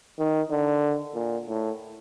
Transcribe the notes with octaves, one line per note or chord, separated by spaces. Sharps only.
D#3
D3
A#2
A2